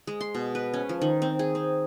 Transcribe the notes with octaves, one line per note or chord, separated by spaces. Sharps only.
G#3
C6
B2
B4
C#4
F3
D#3
C4
G#4
C4